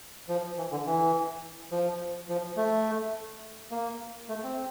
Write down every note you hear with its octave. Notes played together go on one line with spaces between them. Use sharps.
F3
E3
D3
E3
F3
F3
A3
A#3
A3
C4